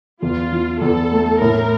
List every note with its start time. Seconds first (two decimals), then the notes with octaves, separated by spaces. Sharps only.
0.22 E2 F4
0.52 E3
0.81 E2 A4
1.12 A3
1.41 A2 A#4